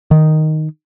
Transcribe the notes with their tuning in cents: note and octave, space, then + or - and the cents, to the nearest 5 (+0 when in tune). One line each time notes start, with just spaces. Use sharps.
D#3 +0